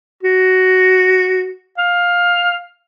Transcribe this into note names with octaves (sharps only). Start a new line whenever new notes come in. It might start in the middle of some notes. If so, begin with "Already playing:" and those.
F#4
F5